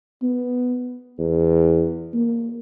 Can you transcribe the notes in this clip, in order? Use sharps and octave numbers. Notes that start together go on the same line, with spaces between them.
B3
E2
A#3